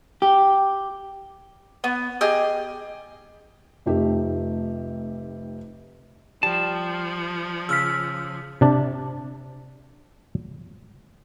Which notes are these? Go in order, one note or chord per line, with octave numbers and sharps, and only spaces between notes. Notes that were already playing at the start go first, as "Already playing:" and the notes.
G4
B3
G4 G#4 D#5
F1 F2 A3 D#4 G4
F3 G3 A5
C#3 E6 F6 B6
C3 D4 A5